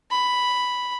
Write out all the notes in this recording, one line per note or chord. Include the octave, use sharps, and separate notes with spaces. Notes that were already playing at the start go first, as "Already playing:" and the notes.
B5